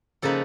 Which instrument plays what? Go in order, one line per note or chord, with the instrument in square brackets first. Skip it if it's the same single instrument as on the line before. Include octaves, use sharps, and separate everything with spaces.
[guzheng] C#3 F3 A#3 D#4 A4 B4